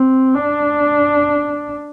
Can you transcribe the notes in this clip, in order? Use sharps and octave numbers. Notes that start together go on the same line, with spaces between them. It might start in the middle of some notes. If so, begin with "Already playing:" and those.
Already playing: C4
D4